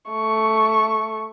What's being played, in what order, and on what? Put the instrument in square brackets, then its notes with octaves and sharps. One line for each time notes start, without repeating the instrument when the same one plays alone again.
[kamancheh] A3 C#6